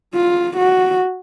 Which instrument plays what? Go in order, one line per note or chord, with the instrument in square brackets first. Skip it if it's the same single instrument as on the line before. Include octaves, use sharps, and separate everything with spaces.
[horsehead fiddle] F4
F#4